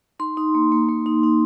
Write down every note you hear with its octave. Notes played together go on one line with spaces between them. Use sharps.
D#4 C6
D#4
A#3
A#3
A#3
D#4
D#4